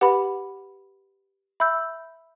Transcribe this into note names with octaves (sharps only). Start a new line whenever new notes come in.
G4 B4 F#5 B5
E5 B5 E6 G6